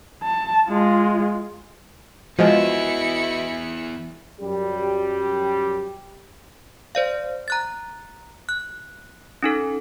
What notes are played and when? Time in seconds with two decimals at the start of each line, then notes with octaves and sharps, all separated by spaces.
0.23 A5
0.68 G#3 F4
2.39 E2 F3 G#3 E4 F#4 B4 D#5 C#7
4.40 F#2 G3 G4
6.95 C5 D5 F5
7.48 A#5 F#6 A6
8.49 F#6
9.43 C#4 D#4 A4